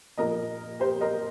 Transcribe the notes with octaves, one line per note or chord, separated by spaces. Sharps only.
A#2 F3 A#3 A#4 D#5
G4 C5
A#4 D#5